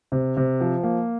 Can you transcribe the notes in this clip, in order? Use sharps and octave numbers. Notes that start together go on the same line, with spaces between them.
C3
C3
F3
A#3